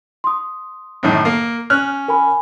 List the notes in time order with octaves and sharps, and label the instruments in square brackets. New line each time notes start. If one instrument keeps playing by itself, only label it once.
[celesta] C6 D#6
[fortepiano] F#2 A2 D#3
A#3
C#4 F6 F#6
[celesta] A#4 G#5 B5